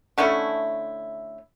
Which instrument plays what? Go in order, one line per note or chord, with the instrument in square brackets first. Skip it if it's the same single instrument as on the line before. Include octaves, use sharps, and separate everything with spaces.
[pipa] D3 A3 C#4 E4